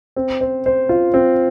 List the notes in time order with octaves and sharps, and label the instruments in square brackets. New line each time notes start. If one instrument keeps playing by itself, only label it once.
[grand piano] C4
C5
C5
F4
C4